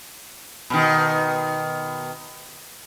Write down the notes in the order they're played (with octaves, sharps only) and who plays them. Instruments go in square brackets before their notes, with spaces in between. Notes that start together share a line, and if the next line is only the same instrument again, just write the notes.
[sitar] B2 D#3